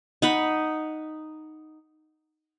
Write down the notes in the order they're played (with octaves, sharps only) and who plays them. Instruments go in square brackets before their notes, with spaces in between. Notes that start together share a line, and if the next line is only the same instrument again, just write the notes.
[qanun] D#4 F#5 B5